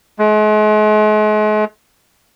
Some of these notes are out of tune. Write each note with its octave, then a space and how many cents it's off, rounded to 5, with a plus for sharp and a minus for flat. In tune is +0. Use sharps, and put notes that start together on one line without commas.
G#3 +45